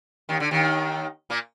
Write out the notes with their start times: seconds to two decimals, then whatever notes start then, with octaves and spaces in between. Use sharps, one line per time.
0.29 D#2 D#3
0.40 D3
0.51 D#2 D#3
1.30 A#2 A#3